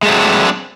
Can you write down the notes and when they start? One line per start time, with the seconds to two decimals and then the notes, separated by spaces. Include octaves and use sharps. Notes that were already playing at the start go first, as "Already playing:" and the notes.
0.03 G#3
0.05 A3
0.08 F#3
0.11 C4
0.13 D4